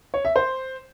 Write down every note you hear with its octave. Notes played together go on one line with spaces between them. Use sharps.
C#5
E5
C5